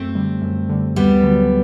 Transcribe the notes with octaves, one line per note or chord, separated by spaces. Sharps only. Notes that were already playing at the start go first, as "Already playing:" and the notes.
Already playing: F#2 A3 C4
D3 G3
F#2
D3 G3
D2 G3 B3
D3 F#3